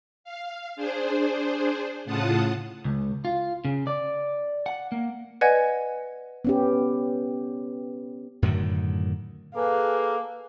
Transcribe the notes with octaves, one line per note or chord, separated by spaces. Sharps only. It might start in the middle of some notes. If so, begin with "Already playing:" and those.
F5
D4 G#4 C5
A2 C#3 F4 F#5 A5 D#6
C#2
F4
C#3
D5
F#5
A#3
B4 D5 D#5 F#5 G#5 G#6
B3 C#4 G4
F#2 A2 D3 D#3
A#3 G#4 A4 B4 F5